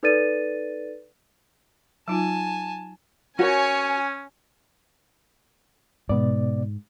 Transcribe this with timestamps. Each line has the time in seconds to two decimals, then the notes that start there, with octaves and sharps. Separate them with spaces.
0.03 D#4 A4 B4 D5 A6 D#7
2.08 F#3 D#4 F4 G#5 A5
3.39 C#4 F#4 A#4 C#5 G#5
6.09 G#2 B2 B3 D5